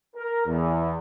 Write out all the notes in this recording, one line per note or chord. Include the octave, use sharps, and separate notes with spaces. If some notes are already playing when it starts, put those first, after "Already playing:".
A#4
E2